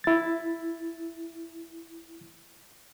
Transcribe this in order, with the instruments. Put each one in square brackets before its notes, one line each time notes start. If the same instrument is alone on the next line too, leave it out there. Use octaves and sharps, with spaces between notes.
[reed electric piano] E4 A6